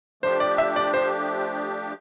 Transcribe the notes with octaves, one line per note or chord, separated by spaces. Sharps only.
F3 A3 D4 G4 C5
D5
E5
D5
C5